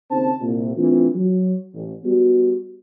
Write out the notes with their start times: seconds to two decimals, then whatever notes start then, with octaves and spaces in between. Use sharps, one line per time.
0.10 D#2 C#3 C4 D#4 C5 A5
0.41 C2 A#2
0.76 E3 A3 C4 D4 F4
1.14 F#3
1.73 A1
2.04 G3 B3 F#4